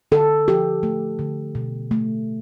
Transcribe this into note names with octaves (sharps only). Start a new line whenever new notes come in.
D3 A4
F3 G4
A3
D3
B2
A3